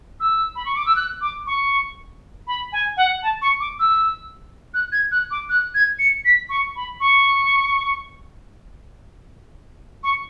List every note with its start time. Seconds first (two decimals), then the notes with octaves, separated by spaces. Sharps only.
0.20 E6
0.56 B5
0.66 C#6
0.75 D6
0.86 E6
0.96 F#6
1.21 D6
1.47 C#6
2.47 B5
2.72 G#5
2.97 F#5
3.23 A5
3.42 C#6
3.60 D6
3.79 E6
4.74 F#6
4.92 G#6
5.12 F#6
5.31 D6
5.49 F#6
5.75 G#6
5.99 C#7
6.25 B6
6.49 C#6
6.76 B5
7.00 C#6
10.03 C#6